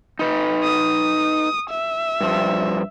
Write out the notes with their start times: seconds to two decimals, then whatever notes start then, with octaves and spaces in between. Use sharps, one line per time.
0.19 D#4 B4
0.63 D#6
1.70 E5
2.21 G2 F3